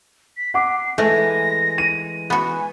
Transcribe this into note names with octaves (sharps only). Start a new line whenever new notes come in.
B6
F#5 D6 C7
E3 G#3 A3 A#6
D#7
B3 F#4 G#5